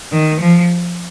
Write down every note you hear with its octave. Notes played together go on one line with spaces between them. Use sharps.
D#3
F3